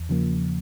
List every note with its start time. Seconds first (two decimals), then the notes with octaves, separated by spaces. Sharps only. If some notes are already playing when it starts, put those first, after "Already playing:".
Already playing: E2
0.09 C#3 F3 A#3